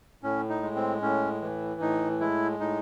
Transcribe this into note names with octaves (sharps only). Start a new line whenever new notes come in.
A2 C#4
D#4
G#3
C4
A2 C#4
E3
A2 D#4
G#3 E4
A2 D#4